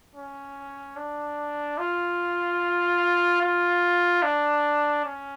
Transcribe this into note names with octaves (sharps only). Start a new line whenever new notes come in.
C#4
D4
F4
F4
D4
C#4